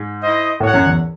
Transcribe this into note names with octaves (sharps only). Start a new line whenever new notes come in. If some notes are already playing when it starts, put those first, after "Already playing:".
Already playing: G#2
E4 C5 D#5
A2 F#4 C#5 F#5
F#2
E2